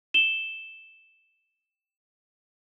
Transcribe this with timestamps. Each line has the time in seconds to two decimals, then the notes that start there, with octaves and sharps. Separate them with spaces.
0.14 E7 G7